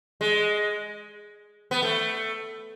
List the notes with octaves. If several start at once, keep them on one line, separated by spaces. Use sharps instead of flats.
G#3
B3
A3